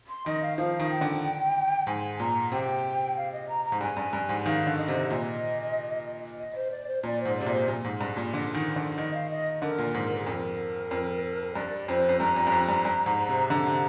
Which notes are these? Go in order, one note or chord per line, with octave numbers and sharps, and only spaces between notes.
C6
D#3 D#5
F5
F3 F5
D#3
G5
D3
G#2 G#5
A#2 A#5
C3 G5
F5
D#5
A#5
A#5
G#2
G2 G#5
G2
G2
G#2
D#3 F5
D3
D#5
C3
A#2 D#5
D#5
C5
D5
C5
A#2 D5
C5
G#2
C3 D5
A#2
C5
A#2
G#2
G2
A#2
D3
D#3
D3
D#3 D#5
F5
D#5
D3 A#4
A#2
G#2
G#4
F2 A#4
F2
G2 D5
F2 C5
F2
G2 A#5
F2
G2
F2
G2
G2
G#2
C3
D3 A#5
C3